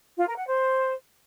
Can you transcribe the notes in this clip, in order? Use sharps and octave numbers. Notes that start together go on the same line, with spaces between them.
F4
A#4
F#5
C5